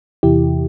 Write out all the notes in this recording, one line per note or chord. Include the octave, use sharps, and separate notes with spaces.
E2 C3 E3 E4 G4